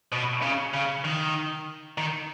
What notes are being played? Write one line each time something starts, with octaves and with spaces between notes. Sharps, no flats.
B2
C#3
C#3
D#3
D#3